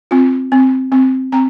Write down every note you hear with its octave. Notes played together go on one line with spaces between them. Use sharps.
C4 F4
C4
C4
C4 G5 A#5